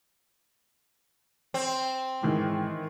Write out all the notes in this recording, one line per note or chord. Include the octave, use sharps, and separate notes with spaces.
C4
G#2 D#3 E3